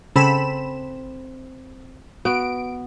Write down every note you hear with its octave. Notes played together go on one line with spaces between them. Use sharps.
C#3 C4 A4 B5 E7
B3 F#4 D7